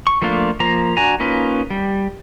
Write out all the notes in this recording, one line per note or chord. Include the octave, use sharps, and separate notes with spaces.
C#6
F3 A3 A#3 D4 F4
F3 A#3 A#5
D4 F#4 G#5 A#5
A#3 C#4 D#4 F4 B4
G3